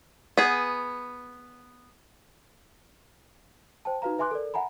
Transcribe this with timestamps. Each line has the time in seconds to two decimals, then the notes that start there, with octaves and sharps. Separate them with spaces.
0.37 B3 G#4
3.85 C5 G5 A5
4.02 D#4 F#4 B4 F5 A#5
4.19 B4 E5 G#5 C6 D6 F#6
4.31 A4 A#4 D5
4.54 E5 F#5 G#5 A#5 B5